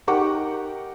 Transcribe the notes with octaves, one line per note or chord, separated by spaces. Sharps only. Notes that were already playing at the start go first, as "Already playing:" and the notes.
D#4 G4 A#4 F#5 C#6 D6